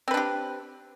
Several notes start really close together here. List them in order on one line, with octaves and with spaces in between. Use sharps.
C4 B4 D4 G4